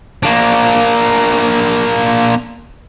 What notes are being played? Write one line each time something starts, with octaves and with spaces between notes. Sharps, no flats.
A#3 D4